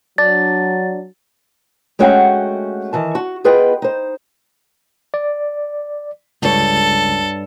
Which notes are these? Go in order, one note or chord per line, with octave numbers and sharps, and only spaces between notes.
F#3 D4 A6
G#3 A3 C#4 F#4 F#5 G5
D#3 E3 A5
F#4
B3 F4 G#4 B4 D#5 G5
D#4 C5
D5
C#2 G2 A4 C#5